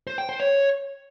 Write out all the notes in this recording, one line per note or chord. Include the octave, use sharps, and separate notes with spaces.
C5
G5
C5
C#5